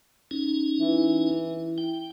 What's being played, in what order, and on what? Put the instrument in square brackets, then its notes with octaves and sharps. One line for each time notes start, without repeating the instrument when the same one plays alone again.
[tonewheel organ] C#4 D#4
[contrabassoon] E3
[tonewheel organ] G5